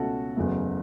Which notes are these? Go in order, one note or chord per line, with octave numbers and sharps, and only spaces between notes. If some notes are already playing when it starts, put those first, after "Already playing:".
Already playing: C#2 B2 A3 C#4 F#4 A4
F#1 E2 C#3 F#3 A3